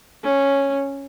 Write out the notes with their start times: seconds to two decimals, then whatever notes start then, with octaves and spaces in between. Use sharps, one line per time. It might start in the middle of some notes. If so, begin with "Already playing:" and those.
0.24 C#4